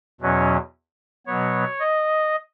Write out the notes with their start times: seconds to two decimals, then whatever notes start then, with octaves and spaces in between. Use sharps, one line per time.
0.20 E2 B2 F#3 C#4
1.27 B2 F#3 B3 C#5
1.80 D#5